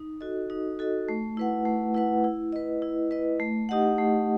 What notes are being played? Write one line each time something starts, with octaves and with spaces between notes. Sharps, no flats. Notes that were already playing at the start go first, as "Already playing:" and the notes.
Already playing: D#4
F#4 A4 D#5
D#4
F#4 A4 D#5
A3
E4 B4 F#5
A3
E4 B4 F#5
E4
B4 D#5
E4
B4 D#5
A3
D#4 G4 D#5 F#5
A3